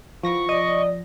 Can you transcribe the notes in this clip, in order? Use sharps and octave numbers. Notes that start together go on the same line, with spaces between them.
D#3 F3 B3 E4 C#6 A#6
C3 D5 D#5